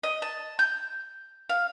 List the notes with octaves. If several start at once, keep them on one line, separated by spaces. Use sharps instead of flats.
D#5
A5
G6
F5